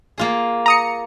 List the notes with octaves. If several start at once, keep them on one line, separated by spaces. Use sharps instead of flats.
A#3 F4 G#4
A#5 D#6 C#7